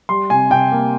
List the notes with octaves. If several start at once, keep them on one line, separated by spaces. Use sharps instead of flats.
G3 C6
C3 G#5
C3 G5
A#3